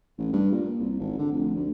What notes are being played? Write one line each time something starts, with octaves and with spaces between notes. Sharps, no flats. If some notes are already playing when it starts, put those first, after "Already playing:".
A1
G2
A#2
C2
G#1
D3
F1
D2